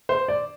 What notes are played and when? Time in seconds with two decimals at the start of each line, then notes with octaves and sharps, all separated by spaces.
0.09 C5
0.28 D5